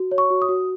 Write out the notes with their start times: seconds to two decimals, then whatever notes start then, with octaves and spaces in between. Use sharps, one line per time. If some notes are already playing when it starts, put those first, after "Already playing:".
Already playing: F#4
0.11 C#5
0.18 C#6
0.30 F#4
0.42 D#6
0.49 F#4